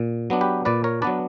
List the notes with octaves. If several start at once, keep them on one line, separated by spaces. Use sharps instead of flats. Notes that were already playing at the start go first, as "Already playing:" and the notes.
Already playing: A#2
F#3 B3 D4
G4 B4
A#2 B4 D5
A#4 C#5
F#3 B3 D4 B4 D5